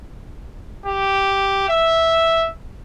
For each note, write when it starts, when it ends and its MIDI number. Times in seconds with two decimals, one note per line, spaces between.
0.86 1.65 67
1.69 2.48 76